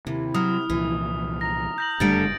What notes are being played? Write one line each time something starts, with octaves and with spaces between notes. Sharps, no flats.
D#2 C3 E4
F#3 D#6 F6
C2 A#2 E3 F3
A#5 A#6
G6 A#6 F#7
F#1 G2 D3 G3 A3 A6 D7